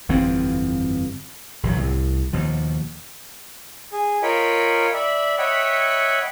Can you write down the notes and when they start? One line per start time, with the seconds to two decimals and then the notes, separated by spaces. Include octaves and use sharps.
0.09 G1 F2 E3 C4
1.63 A#1 E2 F#3
1.76 C2 A2
2.33 D#2 B2 F3
3.92 G#4
4.23 F4 A#4 C#5 D#5 G5 B5
4.94 D5 E5 B5
5.38 C#5 D#5 E5 F#5 G5 B5